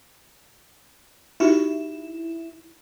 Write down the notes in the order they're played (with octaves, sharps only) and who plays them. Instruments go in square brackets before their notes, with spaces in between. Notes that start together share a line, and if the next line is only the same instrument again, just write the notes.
[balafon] D#4 F#4 G4 [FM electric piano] E4